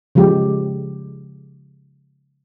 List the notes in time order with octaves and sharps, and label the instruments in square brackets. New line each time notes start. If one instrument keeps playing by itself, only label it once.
[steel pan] C#3 F3 G#3 G4